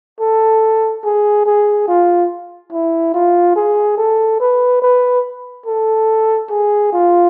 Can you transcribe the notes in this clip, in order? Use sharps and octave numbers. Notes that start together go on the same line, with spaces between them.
A4
G#4
G#4
F4
E4
F4
G#4
A4
B4
B4
A4
G#4
F4